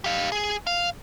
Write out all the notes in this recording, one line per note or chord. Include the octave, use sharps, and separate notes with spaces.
G4 F5
G#4
F5